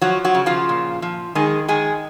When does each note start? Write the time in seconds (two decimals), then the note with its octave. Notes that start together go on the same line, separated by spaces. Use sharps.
0.01 F3 F#3 F#4
0.25 F#3 F#4
0.35 C#3
0.46 F3 F4
0.69 A#2
1.02 F3
1.35 D#3 G#3 G#4
1.68 D#3 G#3 G#4